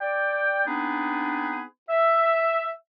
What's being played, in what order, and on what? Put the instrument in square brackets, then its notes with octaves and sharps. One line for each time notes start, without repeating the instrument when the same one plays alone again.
[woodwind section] D5 G5
B3 C4 D4 D#4 G#4 B4
E5